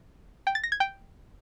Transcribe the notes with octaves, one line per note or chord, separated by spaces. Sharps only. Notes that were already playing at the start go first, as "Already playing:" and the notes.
G5
A6
A#6
G#6
G5